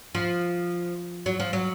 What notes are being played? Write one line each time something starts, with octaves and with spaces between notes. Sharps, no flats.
F3
F#3
F3
F#3